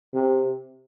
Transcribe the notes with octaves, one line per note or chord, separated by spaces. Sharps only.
C3